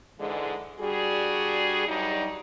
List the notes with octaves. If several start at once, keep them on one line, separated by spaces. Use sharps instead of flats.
G#2 D3 E3 G#3
G3 D4 F#4 G#4
G2 F#3 G3 D4 D#4